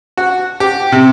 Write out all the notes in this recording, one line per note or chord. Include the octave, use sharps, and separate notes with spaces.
F#4
G4
C3